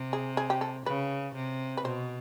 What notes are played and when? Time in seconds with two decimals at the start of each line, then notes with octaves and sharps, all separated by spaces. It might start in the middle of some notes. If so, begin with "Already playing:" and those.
Already playing: C3
0.13 G#4
0.37 G#4
0.50 G4
0.61 A4
0.86 C#3 B4
1.35 C3
1.77 B4
1.85 B2 C5